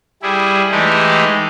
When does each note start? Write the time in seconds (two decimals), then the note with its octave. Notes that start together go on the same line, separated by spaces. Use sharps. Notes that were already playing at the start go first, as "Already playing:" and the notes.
0.22 G3 E4 G#4
0.71 E3 G#3 A3 D#4 G4